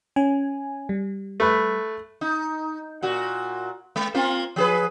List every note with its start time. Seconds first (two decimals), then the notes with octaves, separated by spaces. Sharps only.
0.16 C#4 G#5
0.89 G3
1.40 A3 B4
2.21 D#4
3.03 A#2 F#4
3.96 G#3
4.14 A#3 C4 F4
4.56 F3 G#4 B4